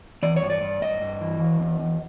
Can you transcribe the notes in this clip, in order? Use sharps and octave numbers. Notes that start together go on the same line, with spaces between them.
E3 D5
C#5
G2
D5
G2
G2 D#5
G2
E3
E2
E2
E2